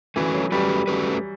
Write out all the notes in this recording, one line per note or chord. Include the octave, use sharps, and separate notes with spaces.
E3 A3 C#4 F#4 B4
F#3
G3 A3 C#4 F#4 B4
A3 C#4 F#4 B4